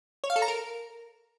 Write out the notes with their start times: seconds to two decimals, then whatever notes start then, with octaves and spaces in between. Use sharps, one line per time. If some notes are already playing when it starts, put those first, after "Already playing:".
0.24 C#5
0.30 F5
0.36 A4
0.42 A#5
0.48 A#4